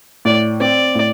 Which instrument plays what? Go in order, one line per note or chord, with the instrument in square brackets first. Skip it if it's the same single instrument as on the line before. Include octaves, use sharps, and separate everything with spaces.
[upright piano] A2 [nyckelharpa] D5
[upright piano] C4 [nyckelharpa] D5
[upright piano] A2